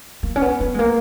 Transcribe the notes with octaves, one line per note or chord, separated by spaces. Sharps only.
A#3
C#4
B3
B3
G#3
A#3